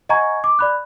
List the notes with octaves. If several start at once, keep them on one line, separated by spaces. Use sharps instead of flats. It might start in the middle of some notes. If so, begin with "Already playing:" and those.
D#5 F#5 G#5 A#5 C#6 G#6
D6
D5 B5 F#6